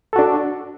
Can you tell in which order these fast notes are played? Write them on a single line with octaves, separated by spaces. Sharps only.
A4 F#4 D4